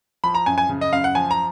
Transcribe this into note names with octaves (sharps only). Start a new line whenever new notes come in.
F3 B5
A#5
F#2 G#5
G#5
C#3
D#5
F#2 F5
F#5
F3 G#5
A#5